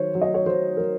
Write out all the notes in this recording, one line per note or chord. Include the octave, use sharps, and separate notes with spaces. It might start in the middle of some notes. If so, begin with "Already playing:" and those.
Already playing: D#3 F#3 C5 C#5
F#3
D#5
C#5
F#3 C5
F#3 A#4